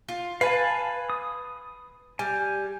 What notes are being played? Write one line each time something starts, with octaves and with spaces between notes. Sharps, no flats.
F4
B4 F5 G#5 A5
D#6
G3 G#5